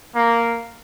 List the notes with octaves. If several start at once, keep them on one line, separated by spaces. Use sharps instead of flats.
A#3